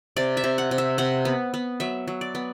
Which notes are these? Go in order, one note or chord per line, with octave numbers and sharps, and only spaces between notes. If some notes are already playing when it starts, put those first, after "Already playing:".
C3 D5
E5
C3
F#5
C3
E5
C3 F#5
B3
B3
F#3 E5
F#3
D5
B3